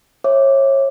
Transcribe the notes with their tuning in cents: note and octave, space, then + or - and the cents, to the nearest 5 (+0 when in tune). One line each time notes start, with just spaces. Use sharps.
C#5 -30 E5 +0 D6 +0